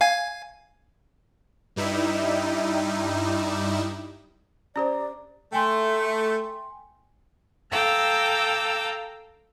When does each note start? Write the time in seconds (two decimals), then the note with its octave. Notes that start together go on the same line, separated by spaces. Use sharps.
0.01 F5 G#5 G#6
1.76 G2 G3 D#4 E4
4.76 C#4 G4 C5 D5 A#5
5.52 A3 G5 G#5 C6
7.71 A4 F5 G5 A#5 D6 E6